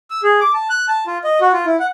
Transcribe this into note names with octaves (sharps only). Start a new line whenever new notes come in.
E6
G#4
D6
A5
F#6
A5
F4
D#5
F#4
F4
E4
F#5